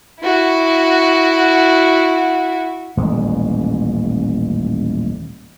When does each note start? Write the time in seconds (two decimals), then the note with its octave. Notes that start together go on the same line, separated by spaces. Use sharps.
0.21 E4 F#4
2.97 D#1 A1 G#3